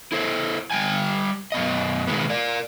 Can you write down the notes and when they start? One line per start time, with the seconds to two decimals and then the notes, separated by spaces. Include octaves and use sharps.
0.12 E4 A4 C5
0.71 G3 G5 G#5
1.52 F#2 B2 D#5
2.07 B2 D#3 G#3 B3
2.30 A#4 D5